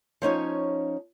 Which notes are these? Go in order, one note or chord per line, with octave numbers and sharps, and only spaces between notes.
F3 C#4 D#4 C#5